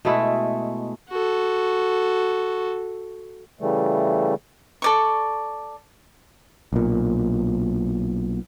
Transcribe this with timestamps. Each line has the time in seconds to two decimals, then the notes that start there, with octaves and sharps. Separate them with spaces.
0.05 B2 G#3 A3 E4
1.10 F#4 A4
3.61 C#3 E3 G3 A3
4.82 A4 D5 C#6
6.73 B1 A#2